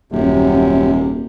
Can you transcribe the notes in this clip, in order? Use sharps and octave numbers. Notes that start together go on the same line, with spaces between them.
D#1 F#2 C3